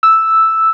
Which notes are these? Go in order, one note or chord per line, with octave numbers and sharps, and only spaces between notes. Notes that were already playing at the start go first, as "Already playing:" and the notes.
E6